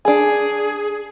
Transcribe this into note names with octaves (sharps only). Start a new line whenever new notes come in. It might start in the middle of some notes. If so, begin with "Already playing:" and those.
D4 G#4 G#5